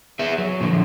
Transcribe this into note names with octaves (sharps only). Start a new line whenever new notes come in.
G#4 B4 E5
F#3
A#2 D3 D#3 F3